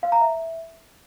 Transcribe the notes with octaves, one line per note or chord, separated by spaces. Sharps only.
F5
A#5
E5